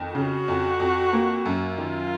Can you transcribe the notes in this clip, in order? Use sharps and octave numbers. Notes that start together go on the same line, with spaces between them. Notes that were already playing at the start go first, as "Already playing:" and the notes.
Already playing: F2 D#3
C#3 F#4
F2
F2
A#3
F#2
D#3 F4